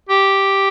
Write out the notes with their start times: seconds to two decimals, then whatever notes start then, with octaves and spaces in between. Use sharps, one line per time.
0.09 G4